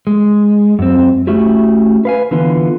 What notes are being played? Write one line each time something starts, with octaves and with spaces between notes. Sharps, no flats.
G#3
F#2 C4
A3 C#4 E4 F#4 G4
B4 F5 G#5
D3 E3 B3 F4